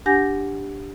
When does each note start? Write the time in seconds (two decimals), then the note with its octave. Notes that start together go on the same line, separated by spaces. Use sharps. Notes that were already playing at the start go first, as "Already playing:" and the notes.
0.06 D4 G4 F#5 G#5 G6 A#6